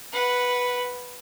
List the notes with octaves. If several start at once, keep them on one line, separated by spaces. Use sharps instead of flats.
B4 F#5